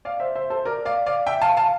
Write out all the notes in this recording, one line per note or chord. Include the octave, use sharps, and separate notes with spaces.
D5 F5
C5 E5
C5 E5
A4 C5
A#4 D5
D5 F5
D5 F5
E5 G5
F5 A5
F5 A5